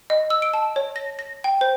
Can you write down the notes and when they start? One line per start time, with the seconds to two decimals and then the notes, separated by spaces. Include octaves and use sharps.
0.10 D#5
0.30 E6
0.42 D7
0.54 A5
0.76 C#5
0.96 A#6
1.19 A#6
1.44 G5
1.61 C5